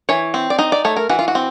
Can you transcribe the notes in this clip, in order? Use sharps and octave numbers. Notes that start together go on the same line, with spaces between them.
E3 C#5
C4
D5
D#4 D#5
D5
A3 C#5
A#4
E3 F#4
F4
F#4
C4